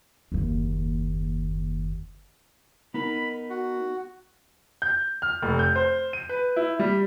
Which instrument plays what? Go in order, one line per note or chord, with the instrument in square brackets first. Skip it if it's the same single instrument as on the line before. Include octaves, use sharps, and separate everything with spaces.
[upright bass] F#1 D#2
[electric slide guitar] B3 D#4 A#4 [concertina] B5
[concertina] F#4
[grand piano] G6
F6
F1
G6
C5
D#7
B4
E4
G3